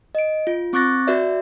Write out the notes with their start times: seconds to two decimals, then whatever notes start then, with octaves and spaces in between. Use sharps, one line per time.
0.15 D#5 D7
0.47 F4
0.73 C4 C#6 D6 F#6 A6 A#6
1.07 F#4 B4 D5 E5